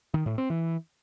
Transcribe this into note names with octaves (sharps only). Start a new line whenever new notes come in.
D#3
A2
C4
E3